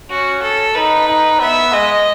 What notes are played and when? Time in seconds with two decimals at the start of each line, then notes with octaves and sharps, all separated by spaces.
0.10 C#4 F#4
0.42 A4
0.75 D#4 B4
1.08 D#4
1.40 B3 E5
1.72 G#3 D#5